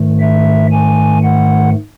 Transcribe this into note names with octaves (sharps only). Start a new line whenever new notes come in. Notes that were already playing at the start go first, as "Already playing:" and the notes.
Already playing: G#2 D#3 A3
E5
G#5
F#5